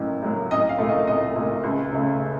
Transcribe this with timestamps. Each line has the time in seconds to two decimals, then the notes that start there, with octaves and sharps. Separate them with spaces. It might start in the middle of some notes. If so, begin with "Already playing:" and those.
Already playing: A1 A2 F#3 A#3
0.22 A2 F#3 A#3
0.51 C2 D#5
0.69 F5
0.78 A#2 A3
0.89 D#5
1.07 C2 D#5
1.36 A#2 A3
1.63 C#2
1.92 C#3 A3